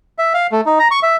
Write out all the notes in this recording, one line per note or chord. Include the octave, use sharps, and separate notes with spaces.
E5
F5
A3
D#4
A#5
C#6
E5